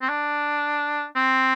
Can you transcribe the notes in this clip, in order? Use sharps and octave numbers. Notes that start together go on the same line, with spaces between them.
C4
D4
C4